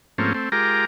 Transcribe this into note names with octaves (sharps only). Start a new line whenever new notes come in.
G#2 F3 A3 A#3 C4 C#4
A3 C4
G#3 F4 G4 A#4 A#5 D6